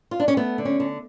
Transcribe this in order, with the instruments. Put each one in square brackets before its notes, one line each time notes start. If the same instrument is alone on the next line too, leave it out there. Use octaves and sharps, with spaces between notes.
[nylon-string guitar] F4
D4
C#4
A3 B3
D3
C#4
D3